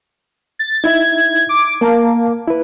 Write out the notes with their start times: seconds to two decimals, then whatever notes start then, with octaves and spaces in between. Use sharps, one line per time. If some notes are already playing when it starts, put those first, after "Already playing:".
0.59 A6
0.84 D#4 E4 E5 G#6
1.49 D6
1.81 A#3 A#4 F5 A5
2.48 E4 B4